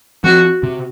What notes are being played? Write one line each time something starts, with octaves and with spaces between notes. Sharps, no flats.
F3 C4 F#4
C3